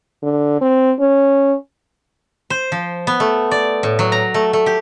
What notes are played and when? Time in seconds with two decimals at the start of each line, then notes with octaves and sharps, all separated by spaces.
0.23 D3
0.61 C4
1.00 C#4
2.50 C5
2.72 F3
3.07 B3
3.20 A3
3.51 D5
3.83 A2
3.99 F#3
4.12 A#5
4.34 A3
4.53 A3
4.66 G4